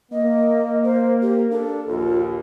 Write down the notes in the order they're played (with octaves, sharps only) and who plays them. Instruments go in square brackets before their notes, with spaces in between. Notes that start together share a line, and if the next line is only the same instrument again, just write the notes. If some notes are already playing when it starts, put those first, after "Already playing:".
[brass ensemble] A#3 [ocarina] D#5
[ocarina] C5
G4
[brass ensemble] D4 [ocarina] A4
[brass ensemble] A#1 D#2 [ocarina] F4